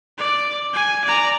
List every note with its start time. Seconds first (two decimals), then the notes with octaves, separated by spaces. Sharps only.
0.18 D5
0.74 G#5
1.05 D5 A#5